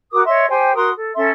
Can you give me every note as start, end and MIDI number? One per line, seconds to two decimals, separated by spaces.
0.11 0.23 66
0.11 0.23 70
0.11 0.23 86
0.11 0.23 87
0.25 0.48 73
0.25 0.48 75
0.25 0.48 76
0.25 0.48 84
0.48 0.73 67
0.48 0.73 72
0.48 0.73 79
0.48 0.73 80
0.74 0.89 66
0.74 0.89 70
0.74 0.89 84
0.74 0.89 87
0.95 1.14 69
1.15 1.29 61
1.15 1.29 69
1.15 1.29 76
1.15 1.29 84